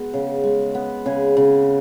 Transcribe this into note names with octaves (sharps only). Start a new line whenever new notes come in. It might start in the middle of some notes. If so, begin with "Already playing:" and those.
Already playing: G#3 B3 F#4
C#3
G#3
B3
C#3 G#4
C#3